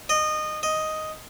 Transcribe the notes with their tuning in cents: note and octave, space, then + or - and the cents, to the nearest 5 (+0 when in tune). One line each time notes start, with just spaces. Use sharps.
D#5 -20
D#5 +5